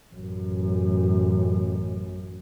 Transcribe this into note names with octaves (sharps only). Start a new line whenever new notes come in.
A1 F#2